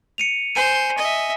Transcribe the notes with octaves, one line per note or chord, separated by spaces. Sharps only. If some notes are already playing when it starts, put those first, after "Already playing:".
C#7 D#7 F7
C5 G#5 D#7
D#5 E5